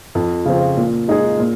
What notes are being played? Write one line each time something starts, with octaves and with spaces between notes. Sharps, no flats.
F2
C#3 F3 C4
A#2
G#3 D#4 G#4
A#2